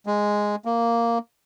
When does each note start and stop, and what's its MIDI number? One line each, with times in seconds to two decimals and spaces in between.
0.06 0.56 56
0.65 1.18 58